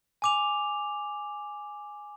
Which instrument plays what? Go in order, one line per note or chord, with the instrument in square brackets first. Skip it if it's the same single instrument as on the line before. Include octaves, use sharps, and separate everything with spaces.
[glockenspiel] G#5 D6 F7